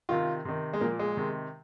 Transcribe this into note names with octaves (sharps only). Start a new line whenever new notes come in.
C3 D#3 F4
C3 D#3
G#3
A#2 F3 A#3
G#3
C3 D#3